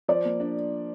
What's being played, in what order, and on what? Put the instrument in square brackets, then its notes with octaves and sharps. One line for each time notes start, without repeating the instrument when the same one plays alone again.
[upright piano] F3 [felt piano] D5
[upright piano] A#3
D4